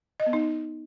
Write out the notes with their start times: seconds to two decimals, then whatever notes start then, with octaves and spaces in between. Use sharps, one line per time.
0.20 D#5
0.26 B3
0.33 D#4